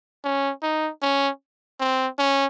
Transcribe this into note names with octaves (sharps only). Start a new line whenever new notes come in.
C#4
D#4
C#4
C4
C#4